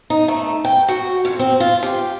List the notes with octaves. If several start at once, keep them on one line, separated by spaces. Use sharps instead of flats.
D#4
A3
G5
F#4
F2
C4
F4
G4